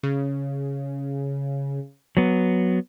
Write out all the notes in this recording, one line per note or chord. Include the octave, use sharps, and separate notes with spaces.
C#3
F#3 B3